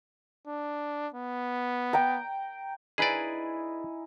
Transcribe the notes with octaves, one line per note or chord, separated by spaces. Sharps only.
D4
B3
G5 A#5
D#4 E4 G#4 B4 D5 G#5